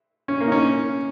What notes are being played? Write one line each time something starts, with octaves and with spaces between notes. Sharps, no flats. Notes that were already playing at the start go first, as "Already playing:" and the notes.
C#4
A#3
D#4
C#4